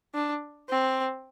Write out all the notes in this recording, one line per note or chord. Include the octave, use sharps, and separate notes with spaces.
D4
C4